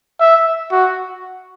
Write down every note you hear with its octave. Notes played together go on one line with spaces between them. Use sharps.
E5
F#4